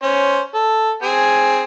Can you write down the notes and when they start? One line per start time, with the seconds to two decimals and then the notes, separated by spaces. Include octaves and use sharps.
0.02 C#4 C5
0.54 A4
1.03 C4 G#4 G#5